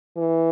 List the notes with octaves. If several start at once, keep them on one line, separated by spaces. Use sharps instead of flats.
E3